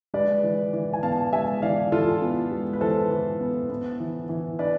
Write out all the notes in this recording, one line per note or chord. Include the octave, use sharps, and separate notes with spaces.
G#3 B4 D5
E3
E3
G#5
B3 F5 A5
G#3 E5 G#5
E3 D5 F5
E3 F4 A4
B3
G#3
B4
E3 A4 C5
E3
B3
B3
E3
E3
D4 B4 D5